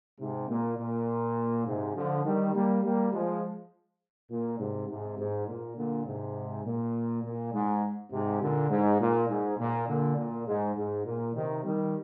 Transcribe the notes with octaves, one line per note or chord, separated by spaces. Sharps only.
G#2 C3
A#2
A#2
G#2 C3
D3 F3
D#3 G3
G3 A#3
G3 A#3
F3 G#3
A#2
G#2 C3
G#2 C3
G#2
A#2
A#2 D3
G#2 C3
A#2
A#2
G#2
G#2 C3
A#2 D3
G#2
A#2
G#2
A#2
A#2 D3
A#2
G#2
G#2
A#2
C3 D#3
D#3 G3